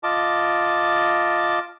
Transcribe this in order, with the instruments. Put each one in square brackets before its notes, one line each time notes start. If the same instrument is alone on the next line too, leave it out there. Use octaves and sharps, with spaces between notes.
[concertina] F4 D#5 A5 D6